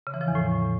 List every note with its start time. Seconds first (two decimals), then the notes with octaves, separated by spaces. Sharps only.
0.07 C#3
0.14 E3
0.21 F3
0.28 E2
0.35 A2